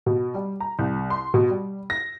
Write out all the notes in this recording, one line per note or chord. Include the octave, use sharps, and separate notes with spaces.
B2
G3
A#5
C2
C6
B2
G3
A#6